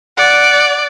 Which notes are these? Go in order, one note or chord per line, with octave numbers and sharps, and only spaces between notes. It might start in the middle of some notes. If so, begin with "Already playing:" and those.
D5 F#5